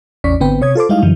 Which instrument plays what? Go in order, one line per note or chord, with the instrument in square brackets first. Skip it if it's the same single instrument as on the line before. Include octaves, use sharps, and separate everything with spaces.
[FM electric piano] A1 E2 C#4 D5 C#6 B6
G#1 D3 B3 C4 B4 G5
C3 C#5 D#6 G#6
F4 A4 C5 D6
G3 G#3 D#4 E4 D#5 F5
F#2 D3 E3 F#3